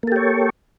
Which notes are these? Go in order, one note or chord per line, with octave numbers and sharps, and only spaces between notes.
A#3 G4 A4 C#5